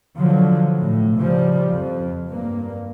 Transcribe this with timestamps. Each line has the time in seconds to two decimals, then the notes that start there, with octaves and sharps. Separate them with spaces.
0.18 D3 F3 F#3
0.81 A2
1.18 C#3 F3 G3
1.73 F2
2.28 G2 A#3